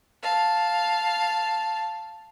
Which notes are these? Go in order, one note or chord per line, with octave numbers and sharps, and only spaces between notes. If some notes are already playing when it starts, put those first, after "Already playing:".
F5 A5